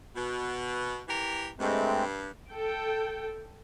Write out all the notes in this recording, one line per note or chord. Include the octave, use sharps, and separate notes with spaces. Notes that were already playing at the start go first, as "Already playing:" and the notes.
B2
E3 G4 A#4
G2 G#3 A3 C4
A4 G5